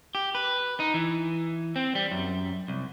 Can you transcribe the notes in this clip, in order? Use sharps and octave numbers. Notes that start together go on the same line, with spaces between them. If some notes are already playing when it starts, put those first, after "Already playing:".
G4
B4
D#4
E3
C4
G3
F#2
C2